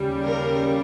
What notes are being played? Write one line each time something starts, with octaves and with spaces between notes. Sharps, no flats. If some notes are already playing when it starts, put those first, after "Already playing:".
Already playing: D#2 C#3 G3
A#4